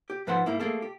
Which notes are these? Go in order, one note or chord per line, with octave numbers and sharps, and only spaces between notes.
G4
G#2 F3 B4 C5 F#5 C6
G#2 A#3 E4
A3 A#3 G#4 A4
G4